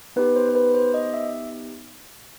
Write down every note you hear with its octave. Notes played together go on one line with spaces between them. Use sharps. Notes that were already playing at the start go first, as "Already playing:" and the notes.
B3 D#4 G4 B4
C5
C5
B4
C5
D#5
E5